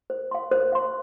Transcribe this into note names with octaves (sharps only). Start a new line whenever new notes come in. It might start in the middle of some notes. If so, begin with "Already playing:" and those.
C5
F5 C6
C5
F5 C6